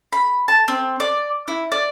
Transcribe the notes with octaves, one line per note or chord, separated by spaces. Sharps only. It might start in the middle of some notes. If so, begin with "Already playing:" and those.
B5
A5
C4
D5
E4
D5